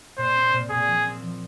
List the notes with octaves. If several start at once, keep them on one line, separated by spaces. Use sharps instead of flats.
A#2 C5
C4
A#2
A#2 G#4
F3
C4
F3